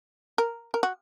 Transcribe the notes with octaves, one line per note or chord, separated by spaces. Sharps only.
A#4
A#4
F#4